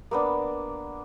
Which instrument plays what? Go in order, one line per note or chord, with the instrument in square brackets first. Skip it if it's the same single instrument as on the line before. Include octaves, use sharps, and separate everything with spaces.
[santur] A#3 B3 D4